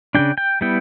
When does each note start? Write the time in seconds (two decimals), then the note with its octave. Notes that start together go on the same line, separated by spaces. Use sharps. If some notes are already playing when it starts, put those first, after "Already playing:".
0.15 C#3 G3 D4 G5
0.38 G5
0.61 G3 B3 E4 G5